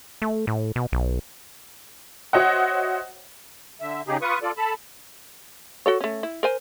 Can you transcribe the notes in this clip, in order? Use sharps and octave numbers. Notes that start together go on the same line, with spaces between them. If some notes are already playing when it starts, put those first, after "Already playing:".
A3
A2
B2
B1
F#4 C5 C#5 D#5 E5 F#5
D3 E5
C#3 D#4 G4 G#4
F4 B4 C#6 D#6
F4 A4 D5
A4 A5 B5
F#4 A4 C#5
A3 C#4
E4
A#4 C5 G#5